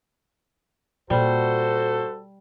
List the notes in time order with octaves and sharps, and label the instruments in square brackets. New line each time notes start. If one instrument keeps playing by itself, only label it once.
[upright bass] A#2 [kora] G3 [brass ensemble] F#4 A4 [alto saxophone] C5